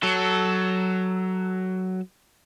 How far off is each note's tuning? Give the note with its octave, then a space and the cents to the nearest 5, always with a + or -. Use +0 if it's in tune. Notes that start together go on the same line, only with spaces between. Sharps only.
F#3 +10 A4 +0